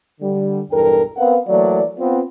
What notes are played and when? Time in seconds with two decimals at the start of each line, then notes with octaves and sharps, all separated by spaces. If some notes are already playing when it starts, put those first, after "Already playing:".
0.21 D3 G3
0.71 B1 E2 G2 A4 A#4 G5
1.17 B3 C4 A#4 B4 F5 F#5
1.48 E3 F#3 A3 A#3 D5
1.99 B3 C4 F4